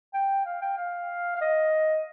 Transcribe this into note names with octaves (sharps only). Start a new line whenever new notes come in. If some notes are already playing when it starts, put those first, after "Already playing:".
G5
F5
G5
F5
F5
D#5